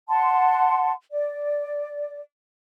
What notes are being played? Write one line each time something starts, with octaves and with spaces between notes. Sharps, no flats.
F#5 A5 C6
D5